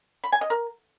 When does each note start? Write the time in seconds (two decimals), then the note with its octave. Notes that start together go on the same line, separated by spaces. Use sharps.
0.24 B5
0.32 G#5
0.41 D#5
0.50 A#4